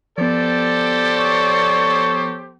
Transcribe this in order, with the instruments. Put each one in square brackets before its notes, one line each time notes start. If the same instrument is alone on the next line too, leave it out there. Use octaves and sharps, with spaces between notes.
[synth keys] F3 B3 [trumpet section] G4 A4 C5 [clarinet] D5
[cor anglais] C#5